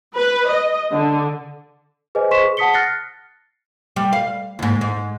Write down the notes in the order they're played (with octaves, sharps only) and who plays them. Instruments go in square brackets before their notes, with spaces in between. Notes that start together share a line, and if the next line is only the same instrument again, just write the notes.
[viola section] B4
D#5
D3
[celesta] G#4 B4 C5 D#5 G#5
C5 C6 C#6 B6 E7
G#4
F#5 A5 D#6 B6 C#7 G7
F6 F#6 A6 A#6 C7 C#7
[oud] G3
F5
D#2 G#2
G#2